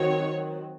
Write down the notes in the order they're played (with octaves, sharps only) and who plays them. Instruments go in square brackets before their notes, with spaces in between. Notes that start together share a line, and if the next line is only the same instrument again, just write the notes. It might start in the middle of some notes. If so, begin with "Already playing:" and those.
Already playing: [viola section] D#3 F#3 C4 C#5